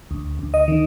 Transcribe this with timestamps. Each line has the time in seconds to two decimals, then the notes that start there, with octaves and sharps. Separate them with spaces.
0.11 D2
0.39 D2
0.54 D#5
0.68 D#3